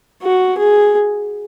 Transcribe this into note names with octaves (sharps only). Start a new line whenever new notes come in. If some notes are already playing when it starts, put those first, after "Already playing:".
F#4
G#4